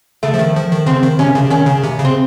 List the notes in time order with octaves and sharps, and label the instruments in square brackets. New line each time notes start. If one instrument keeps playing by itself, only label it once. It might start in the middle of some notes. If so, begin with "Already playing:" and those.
[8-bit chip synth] C#3 [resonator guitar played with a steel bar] A3
[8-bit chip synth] F3
D#3
F3
D#3
[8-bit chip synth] C#3 [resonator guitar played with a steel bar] C4
[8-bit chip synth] D#3
[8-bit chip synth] C3 [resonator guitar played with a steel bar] C#4
[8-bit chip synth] C#3
[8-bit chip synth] D#3 [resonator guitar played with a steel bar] C#4
[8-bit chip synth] C#3
C3
C#3
[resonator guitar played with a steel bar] C4